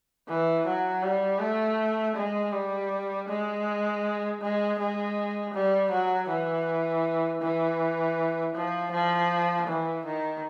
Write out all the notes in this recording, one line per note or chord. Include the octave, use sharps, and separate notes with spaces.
E3
F#3
G3
A3
G#3
G3
G#3
G#3
G#3
G3
F#3
E3
E3
F3
F3
E3
D#3